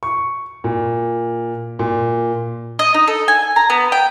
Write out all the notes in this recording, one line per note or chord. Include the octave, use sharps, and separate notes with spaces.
C#6
A#2
A#2
D#5
D#4
A4
G#5
A#5
B3
G5